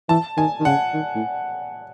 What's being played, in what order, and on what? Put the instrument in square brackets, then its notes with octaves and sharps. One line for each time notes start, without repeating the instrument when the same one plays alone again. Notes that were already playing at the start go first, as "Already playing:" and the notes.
[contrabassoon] E3 [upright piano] A5
[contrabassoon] D#3 [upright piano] G#5
[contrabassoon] D#3
[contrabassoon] C#3 [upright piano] F#5
[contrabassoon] D#3
A2